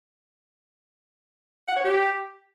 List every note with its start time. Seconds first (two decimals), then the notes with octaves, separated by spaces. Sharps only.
1.67 F#5
1.75 C#5
1.84 G4